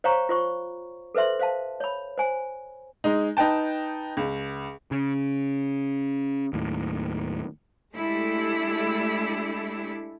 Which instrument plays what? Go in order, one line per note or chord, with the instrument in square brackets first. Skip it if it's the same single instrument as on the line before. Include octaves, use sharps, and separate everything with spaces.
[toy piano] C5 C#5 F5 G5 A#5 C#6
F4 C5 C#6
A4 B4 C5 E5 C6
C5 F5 A5
C#5 B5
C5 G#5
[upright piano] G#3 D#4
D#4 B4 G5 A5
C#2
[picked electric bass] C#3
D#2 A2
[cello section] G#3 A3 D4 E4 G4 A4